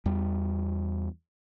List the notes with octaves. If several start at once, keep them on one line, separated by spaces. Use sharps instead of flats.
E2 G3